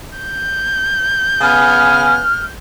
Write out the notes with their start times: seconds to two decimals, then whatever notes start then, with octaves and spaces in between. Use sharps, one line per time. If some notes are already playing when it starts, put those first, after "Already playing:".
0.18 G6
1.41 C#3 B3 G#5 F6